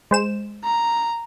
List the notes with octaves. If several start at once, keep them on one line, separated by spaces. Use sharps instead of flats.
G#3 C5 E7
A#5